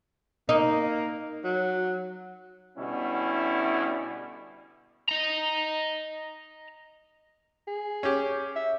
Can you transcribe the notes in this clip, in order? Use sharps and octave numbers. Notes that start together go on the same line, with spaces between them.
A#3 D#4
F#3
B2 D3 G3 C#4 E4
D#5 A#5
G#4
C#4 G4
E5